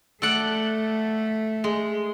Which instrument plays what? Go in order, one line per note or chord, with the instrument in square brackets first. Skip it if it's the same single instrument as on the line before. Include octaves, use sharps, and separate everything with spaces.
[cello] A3 [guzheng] A4 D5 F#5
[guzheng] G#3